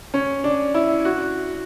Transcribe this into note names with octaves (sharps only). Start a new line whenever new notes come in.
C#4
D4
E4
F#4